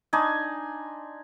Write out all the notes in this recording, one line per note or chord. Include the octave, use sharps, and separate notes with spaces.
D4 D#4 G#5 C6